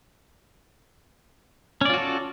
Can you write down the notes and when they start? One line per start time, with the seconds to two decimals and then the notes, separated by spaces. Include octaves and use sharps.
1.81 C#4
1.85 D5
1.90 F4
1.94 F#4
1.98 A4